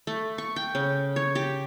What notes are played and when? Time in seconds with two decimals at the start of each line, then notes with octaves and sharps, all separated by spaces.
0.07 A3
0.38 C#6
0.56 G5
0.75 C#3
1.16 C#5
1.35 G4